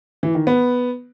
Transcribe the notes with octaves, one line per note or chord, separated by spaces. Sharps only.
E3
D#3
B3